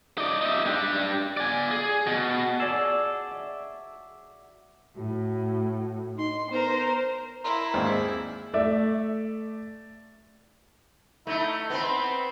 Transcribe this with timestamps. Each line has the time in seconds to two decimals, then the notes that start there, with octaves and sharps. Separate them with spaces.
0.18 D#4 D5
0.41 D#4 E5
0.66 D4 G4
1.37 D5 G#5
1.71 G#4
2.07 B2
2.60 F#4 G#4 A4 D5
3.31 E5
4.97 A2 F#4
6.17 D#4 C6
6.51 B3 A#4 C5
7.44 E4 A#4 A#5 C6
7.74 D#2 G#2 C4 G#4 D5
8.54 A3 D5 E5
11.27 A3 D#4 E4
11.70 B3 C4 B5